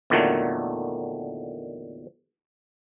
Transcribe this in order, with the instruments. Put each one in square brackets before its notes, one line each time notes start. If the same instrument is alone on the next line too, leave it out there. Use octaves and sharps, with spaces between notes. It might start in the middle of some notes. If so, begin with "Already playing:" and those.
[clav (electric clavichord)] E2 A#2 D3 D#3 F#3 A3